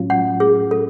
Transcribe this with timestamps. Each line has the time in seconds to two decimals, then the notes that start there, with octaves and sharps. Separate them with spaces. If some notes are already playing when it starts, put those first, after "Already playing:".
Already playing: A2 F#3 C#4 F4
0.10 F#5
0.40 G#4
0.71 A4